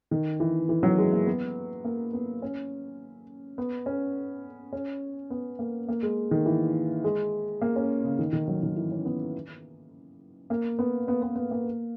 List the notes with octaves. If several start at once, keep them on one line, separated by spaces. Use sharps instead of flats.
D#3
E3
E3
F#3
G#3
A#3
B3
A#3
B3
C#4
B3
C#4
C#4
B3
A#3
A#3
G#3
D#3
E3
G#3
A#3
C#4
C#3
D#3
D#3
F#3
D#3
E3
C#4
B3
A#3
B3
B3
B3
B3
A#3